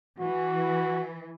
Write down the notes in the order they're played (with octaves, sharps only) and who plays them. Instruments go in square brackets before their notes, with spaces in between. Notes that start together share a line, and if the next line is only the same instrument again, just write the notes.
[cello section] E3 [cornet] F#4